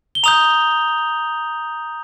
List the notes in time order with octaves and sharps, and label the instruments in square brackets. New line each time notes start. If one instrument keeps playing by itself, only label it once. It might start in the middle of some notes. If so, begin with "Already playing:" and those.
[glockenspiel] G7
A#5 D#6 G6 F7